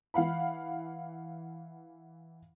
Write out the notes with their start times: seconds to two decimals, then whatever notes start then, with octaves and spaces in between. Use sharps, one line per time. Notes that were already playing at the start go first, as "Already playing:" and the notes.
0.14 E3 F5 F#5 B5